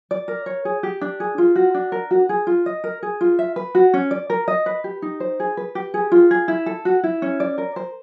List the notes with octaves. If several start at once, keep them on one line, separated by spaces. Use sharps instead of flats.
D5
A#4
C#5
G#4
G4
D4
G#4
F4
F#4
D4
A#4
F#4
G#4
F4
D#5
A#4
G#4
F4
E5
B4
F#4
C#4
D5
A#4
D#5
B4
G4
D#4
C5
G#4
B4
G4
G#4
F4
G#4
E4
A4
F#4
E4
C#4
D5
A#4
C5